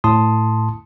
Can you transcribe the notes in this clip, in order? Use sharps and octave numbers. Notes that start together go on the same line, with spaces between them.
A2 A5 C6 D#6